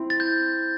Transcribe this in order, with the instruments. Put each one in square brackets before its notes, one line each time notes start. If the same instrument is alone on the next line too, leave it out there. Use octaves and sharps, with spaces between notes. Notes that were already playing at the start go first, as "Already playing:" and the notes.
Already playing: [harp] C4 E4
[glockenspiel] A6
G6